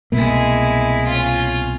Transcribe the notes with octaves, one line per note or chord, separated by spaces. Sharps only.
C2 B2 G#3 A#3 E4
C#4 F4